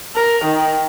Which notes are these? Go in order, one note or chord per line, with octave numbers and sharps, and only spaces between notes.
A#4
D#3